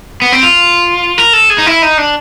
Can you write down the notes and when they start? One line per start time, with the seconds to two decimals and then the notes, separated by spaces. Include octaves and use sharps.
0.22 B3
0.32 C4
0.43 F4
1.18 A#4
1.33 A4
1.50 G#4
1.58 D#4
1.66 E4
1.82 D#4
1.98 D4